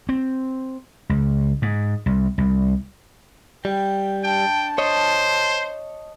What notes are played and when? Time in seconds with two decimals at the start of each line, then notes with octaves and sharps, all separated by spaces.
0.09 C4
1.09 C#2
1.62 G#2
2.06 C2
2.38 C2
3.65 G3 G5
4.23 D4 G5 A5
4.78 C5 C#5 D#5